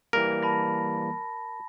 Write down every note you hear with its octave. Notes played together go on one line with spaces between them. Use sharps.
E3 G3 A#3 A#4
A5 B5 A#6